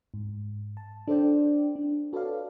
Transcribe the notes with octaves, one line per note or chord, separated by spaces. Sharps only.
G#2
A5
D4 A4 C5 D5 G5
D4
F#4 A4 B4 C#5 D5 F5